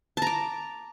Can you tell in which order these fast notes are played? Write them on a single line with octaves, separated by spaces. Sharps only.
A5 A#5 D6